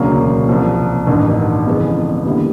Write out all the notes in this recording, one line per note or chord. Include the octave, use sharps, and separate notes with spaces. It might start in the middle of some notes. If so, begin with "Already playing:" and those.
Already playing: E1 D2 C#3 F#3 A#3
C2 C3 F3
A1 G2 D#3
F2 C#3 E3 G#3 B3
D#2 D3 G3 B3 E4